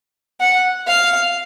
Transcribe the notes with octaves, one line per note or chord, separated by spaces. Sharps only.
F#5
F5